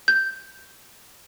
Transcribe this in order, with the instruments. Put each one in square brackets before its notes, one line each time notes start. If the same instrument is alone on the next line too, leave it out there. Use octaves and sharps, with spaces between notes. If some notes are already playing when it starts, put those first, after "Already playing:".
[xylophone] G6